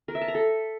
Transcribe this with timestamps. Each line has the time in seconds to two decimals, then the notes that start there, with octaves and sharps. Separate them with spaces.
0.08 A#4
0.15 E5
0.21 A5
0.28 A#5
0.35 A4